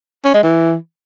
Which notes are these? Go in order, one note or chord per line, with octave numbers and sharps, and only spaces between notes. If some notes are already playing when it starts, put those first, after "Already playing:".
C#4
G#3
E3